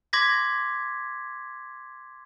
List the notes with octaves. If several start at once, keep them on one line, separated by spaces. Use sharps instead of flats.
C6 D6 G#6 A#6 B6